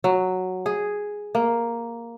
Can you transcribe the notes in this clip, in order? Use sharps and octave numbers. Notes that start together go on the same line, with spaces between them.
F#3
G#4
A#3